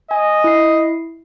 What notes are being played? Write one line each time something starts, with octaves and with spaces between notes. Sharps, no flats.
D#5 G#5
E4 C7